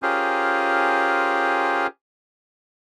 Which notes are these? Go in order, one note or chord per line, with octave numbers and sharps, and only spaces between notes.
C#4 F4 G4 G#4 A#4 C5